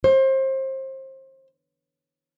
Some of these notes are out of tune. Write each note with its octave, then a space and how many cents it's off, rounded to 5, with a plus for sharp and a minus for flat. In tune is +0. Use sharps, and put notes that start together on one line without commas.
C5 +30